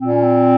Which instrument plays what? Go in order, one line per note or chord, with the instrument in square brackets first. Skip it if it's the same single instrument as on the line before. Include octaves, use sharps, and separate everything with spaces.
[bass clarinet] A#2 [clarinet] C4
[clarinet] C#4
C4